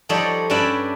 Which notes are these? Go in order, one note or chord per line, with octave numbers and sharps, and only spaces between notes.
F3 G3 D#4 A4 C#5 D5
G2 C#4 D4 B4 D5 E5